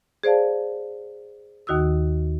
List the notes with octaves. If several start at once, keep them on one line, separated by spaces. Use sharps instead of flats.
G#4 C5 D5 F5 A5
D#2 D#3 F#4 D#6 E6